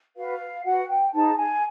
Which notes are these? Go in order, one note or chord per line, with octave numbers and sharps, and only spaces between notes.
F#4 B4 F5
F#4 B4 F#5
G5
D#4 G#4 C5 A5
G#5